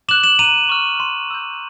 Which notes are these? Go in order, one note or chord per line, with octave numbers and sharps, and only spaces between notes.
D6 F#6 E7 F#7
E7 F#7
A#5 D#7 F7
C#6 F6
C6
E6 G6